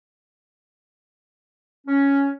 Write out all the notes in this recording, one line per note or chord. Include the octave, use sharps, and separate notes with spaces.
C#4